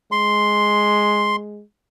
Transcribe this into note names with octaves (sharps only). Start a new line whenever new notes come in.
G#3 C6